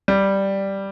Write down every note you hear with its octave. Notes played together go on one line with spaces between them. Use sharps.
G3